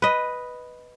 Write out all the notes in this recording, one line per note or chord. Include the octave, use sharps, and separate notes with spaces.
B4 D#5